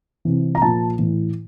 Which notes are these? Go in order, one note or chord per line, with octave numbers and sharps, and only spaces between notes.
C3 E3
A#5
A#2 F3 A5
A2 E3